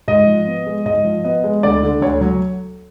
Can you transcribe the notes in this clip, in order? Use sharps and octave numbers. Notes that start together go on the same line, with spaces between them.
G#2 D#5
F3
B3
G#3
G#2 D#5
F3
B3 D#5
G#3
D2 D5
D3
D2 C#5
F#3